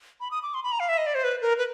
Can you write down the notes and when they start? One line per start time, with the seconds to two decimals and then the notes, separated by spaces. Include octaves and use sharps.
0.20 B5
0.31 D#6
0.43 D6
0.54 C6
0.64 B5
0.72 A#5
0.80 F5
0.89 E5
0.98 D#5
1.06 D5
1.15 C5
1.24 B4
1.41 A#4
1.58 B4